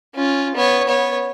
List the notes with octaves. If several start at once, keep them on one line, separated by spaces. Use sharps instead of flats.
C#4 F4
B3 C#5
B3 C#5